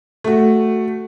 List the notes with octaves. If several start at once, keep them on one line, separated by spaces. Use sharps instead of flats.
A3 F#4